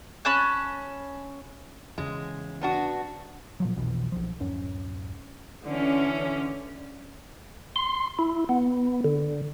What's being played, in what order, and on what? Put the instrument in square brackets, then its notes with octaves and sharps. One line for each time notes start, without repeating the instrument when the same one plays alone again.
[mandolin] C#4 A5 B5 F#6
[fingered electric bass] E2 C#3 [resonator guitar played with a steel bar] G#3
[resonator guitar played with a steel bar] B3 D4 F#4
[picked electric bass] A#2 F3 F#3
B1 F2 B2 E3
B1 F3
D1 F#2 C#4
[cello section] D3 E3 C#4
[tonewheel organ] C6
E4
B3
D3